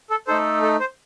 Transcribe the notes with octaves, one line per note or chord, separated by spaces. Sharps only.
A4
A3 D#4 A4 C5
A4
C5